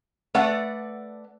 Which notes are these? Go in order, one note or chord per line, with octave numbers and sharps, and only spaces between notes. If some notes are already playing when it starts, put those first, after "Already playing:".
A3 B4 D5 F#5